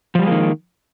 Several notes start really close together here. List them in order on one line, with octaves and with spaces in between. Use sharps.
F3 G3 G#3 A#3 D#3